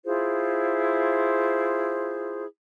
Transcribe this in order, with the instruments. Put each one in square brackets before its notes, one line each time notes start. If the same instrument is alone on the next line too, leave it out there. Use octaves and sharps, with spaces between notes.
[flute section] E4 F4 G#4 C5